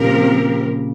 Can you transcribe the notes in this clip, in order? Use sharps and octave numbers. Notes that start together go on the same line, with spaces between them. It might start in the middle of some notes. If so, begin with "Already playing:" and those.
Already playing: A#2 C#3 F3 C4 G4 A#4